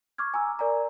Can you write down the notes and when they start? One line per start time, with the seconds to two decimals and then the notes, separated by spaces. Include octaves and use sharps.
0.18 C#6 D6 F6 G#6
0.34 G#5 A#5 E6
0.59 A#4 D5 G#5 A#5